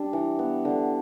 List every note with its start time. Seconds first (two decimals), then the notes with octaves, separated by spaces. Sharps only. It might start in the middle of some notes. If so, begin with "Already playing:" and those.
Already playing: G3 D4
0.13 E3
0.39 B3
0.65 D3